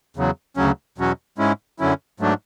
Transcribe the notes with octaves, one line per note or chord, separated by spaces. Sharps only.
E2 C#3 F#3
D2 C#3 F#3 C#4
E2 B2 F#3 C#4 F#4
G#2 G#3 C#4 E4
F#2 D3 F#3 C#4 E4
G#2 F#3 A3 D4